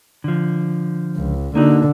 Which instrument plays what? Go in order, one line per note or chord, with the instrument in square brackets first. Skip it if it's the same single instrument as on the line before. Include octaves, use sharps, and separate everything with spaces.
[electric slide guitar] D3 F3
[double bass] C#2
[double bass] D3 [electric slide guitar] A#3 D#4 F#4